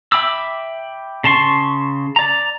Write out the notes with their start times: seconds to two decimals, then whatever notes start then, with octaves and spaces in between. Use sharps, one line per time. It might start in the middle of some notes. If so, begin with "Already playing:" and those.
0.12 E5 G5 B5 D6 E6
1.24 C#3 A5 C6 C#6
2.16 D5 A#5